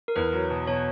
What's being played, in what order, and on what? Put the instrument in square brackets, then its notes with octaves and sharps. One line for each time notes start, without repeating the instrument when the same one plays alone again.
[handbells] A#4
[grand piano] E2 [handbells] B4
[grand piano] F#3
B2
[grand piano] B2 [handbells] C#5